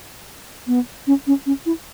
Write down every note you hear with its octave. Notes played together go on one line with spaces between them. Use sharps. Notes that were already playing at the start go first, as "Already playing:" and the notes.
B3
C#4
C#4
C#4
E4